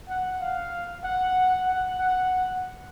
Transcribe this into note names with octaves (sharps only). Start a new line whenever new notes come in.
F#5
F5
F#5
F#5
F#5